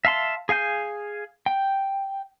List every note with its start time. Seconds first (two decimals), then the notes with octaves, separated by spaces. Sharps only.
0.05 E5 F5 A5 C6
0.49 G#4 F5 G#5 G6
1.46 G5